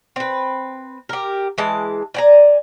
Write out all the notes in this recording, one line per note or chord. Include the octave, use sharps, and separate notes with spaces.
C4 B4
G4 A#4
E3 G#3 A5
D5 G#5 A#5